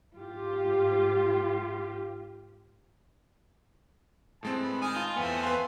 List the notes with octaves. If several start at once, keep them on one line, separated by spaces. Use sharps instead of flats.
G#2 F4 G4
A2 G#3 C4 A5
B4
D#3 G#5 D#6
F4 A5
E2 A3 B3 C4 G#5
B4 F5 C6